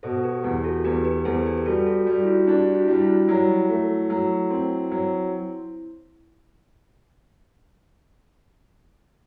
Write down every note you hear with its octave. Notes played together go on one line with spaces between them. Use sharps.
B2 A4 C5
G4 B4
E2 G4
F#4 A4
E2 G4 B4
G4 B4
E2 A4 C5
G4 B4
G4
G3 F#4 A4
F#4 A4
G3 G4
E4
F#4
D4 G4
F#4
E4
G3 F#4
E4
F#3 E4
A3
F#3
C4
F#3